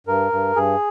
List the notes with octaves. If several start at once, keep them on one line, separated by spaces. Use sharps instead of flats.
G2 A#4
G2
G2 G#4